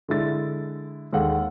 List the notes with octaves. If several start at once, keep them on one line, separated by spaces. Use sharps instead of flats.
D3 G#3 E4 A6
D#2 G#3 A4 F5 F#5